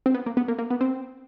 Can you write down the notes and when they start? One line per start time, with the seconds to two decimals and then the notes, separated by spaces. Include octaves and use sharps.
0.06 C4
0.14 B3
0.26 A#3
0.37 B3
0.48 A#3
0.58 A#3
0.70 B3
0.81 C4